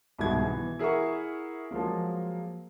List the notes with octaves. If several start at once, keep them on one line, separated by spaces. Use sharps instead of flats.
C2 G#2 B2 D#3 G#3 G#6
E3 B3
E4 G#4 A#4 E5 F#5 C#6
F3 F#3 G#3 A#3